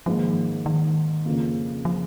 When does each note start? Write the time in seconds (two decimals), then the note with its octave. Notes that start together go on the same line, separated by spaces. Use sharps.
0.06 G#2 D#3 F3 A#3
0.66 D#3
1.25 F2 C#3 F3 A#3
1.85 F3